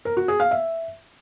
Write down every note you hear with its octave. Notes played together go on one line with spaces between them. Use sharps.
A#4
F#4
G#4
F5
E5